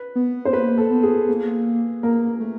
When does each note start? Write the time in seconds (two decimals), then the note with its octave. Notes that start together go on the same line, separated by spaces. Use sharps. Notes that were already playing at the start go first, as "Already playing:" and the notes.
Already playing: B4
0.15 B3
0.45 C5
0.53 A#3 B4
0.78 A4
0.90 B3
1.03 G#4
1.28 A#3
2.03 A#3 A#4
2.40 A3